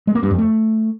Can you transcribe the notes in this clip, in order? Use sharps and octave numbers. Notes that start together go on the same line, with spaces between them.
G#3
A#3
G2
F2
A3